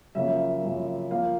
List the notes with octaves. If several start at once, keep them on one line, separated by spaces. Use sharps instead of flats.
F#2 C#3 F3 A#3 E5
F#2 C#3 F3 A#3
F3 A#3 F5